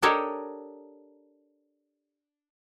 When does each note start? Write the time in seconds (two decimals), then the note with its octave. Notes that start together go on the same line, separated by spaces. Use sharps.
0.02 D4 G4 A4 A#4 C#5 D#5